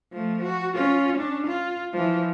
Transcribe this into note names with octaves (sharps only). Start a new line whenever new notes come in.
F3 A3
F#4
C#4 F4
C#4 D4
F4
E3 F3